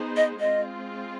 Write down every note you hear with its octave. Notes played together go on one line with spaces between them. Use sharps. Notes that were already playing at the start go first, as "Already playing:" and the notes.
Already playing: B3 D#4 G#4 C5
D#5
G#3 C4 F4 D#5